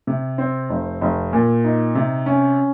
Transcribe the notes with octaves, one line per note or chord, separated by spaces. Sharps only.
C3
C4
F1
F1
A#2
D#4
C3
C#4